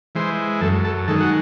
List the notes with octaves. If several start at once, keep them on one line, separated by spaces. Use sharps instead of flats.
E3 G#3 C5
F#2 A4
A4
D#3 G#3 A4
F#4